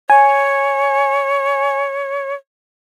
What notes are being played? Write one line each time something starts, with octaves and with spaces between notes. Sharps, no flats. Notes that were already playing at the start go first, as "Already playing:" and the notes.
C#5 G#5